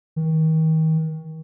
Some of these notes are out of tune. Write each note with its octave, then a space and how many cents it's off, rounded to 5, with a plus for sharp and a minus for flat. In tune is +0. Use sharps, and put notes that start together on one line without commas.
D#3 +35